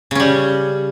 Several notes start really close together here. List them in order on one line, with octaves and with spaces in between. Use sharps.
C#3 C#4 G3